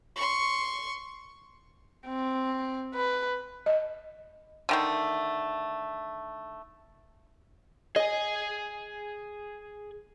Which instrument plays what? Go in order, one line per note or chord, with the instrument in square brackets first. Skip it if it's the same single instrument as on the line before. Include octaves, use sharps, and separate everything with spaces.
[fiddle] C6 C#6
[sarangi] C4
B4
[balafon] D#5
[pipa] D3 D#3 A3
[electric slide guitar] G#4 G#5 [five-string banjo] D#5